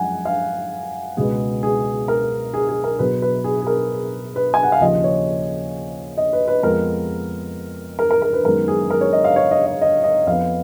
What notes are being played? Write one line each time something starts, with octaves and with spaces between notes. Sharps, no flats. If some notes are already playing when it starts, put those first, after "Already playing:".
Already playing: F#2 F3 G#3 F#5 G#5
F5
C#2 B2 G#3 B3 G#4
G#4
A#4
G#4
G#4
A#4
B2 F#3 B3 B4
B4
G#4
G#4
A#4
B4
G#5
F#5
F5
D#2 C#3 F3 A#3 D#5
C#5
D#5
B4
B4
F2 F3 G#3 B3 A#4
A#4
A#4
A#4
B4
F#2 D#3 G#3 B3 A#4
G#4
A#4
C#5
D#5
F5
C#5
D#5
D#5
D#5
D#5
F2 F3 B3 F5